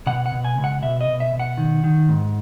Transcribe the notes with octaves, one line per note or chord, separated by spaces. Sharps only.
B2 F#5
F#5
B2
G#5
C#2
F#5
B2 E5
D#5
B2
E5
B2
F#5
D#3
D#3
G#2